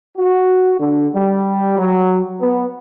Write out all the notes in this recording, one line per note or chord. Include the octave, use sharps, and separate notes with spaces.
F#4
D3
G3
F#3
B3